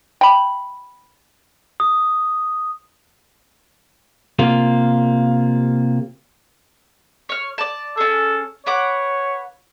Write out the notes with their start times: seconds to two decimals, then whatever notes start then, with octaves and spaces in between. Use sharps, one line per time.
0.21 G5 B5
1.80 D#6
4.39 C3 A#3 F4
7.29 C#5 F6
7.58 D5 A5
7.97 C#4 G#4 A4
8.66 B4 C#5 F#5 D6